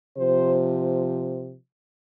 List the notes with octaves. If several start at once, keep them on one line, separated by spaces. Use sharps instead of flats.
C3 F3 C5